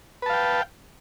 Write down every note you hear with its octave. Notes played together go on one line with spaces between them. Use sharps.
B4 F5 G5 A5